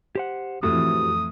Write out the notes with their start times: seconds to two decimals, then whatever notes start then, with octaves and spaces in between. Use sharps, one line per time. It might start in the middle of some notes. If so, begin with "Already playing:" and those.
0.15 G4 C5 F#5
0.63 F2 A2 E3 F#4 G4 D#6